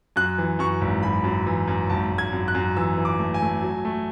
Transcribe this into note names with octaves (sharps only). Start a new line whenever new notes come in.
F#2 F#6
E3
F#2 C#6
G#1
F#2 B5
F#2
E3
F#2
G#1 A5
G#1
G#6
F#2
F#6
F#2
E3 E6
E3
D6
A3
G#5
A3
F#3
A3